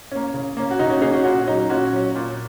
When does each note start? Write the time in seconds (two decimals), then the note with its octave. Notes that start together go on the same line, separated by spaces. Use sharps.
0.12 A#3 C#4
0.34 C#3
0.57 A#3 C#4
0.71 F#4
0.79 C#3 D#4
0.90 C#4 F#4
1.01 A#3 C#4 D#4 G#4
1.13 C#4 F#4
1.24 A#2 C#4 F#4
1.47 F#3 C#4 D#4
1.69 A#2 C#4 F#4
1.92 F#3 C#4
2.16 A#2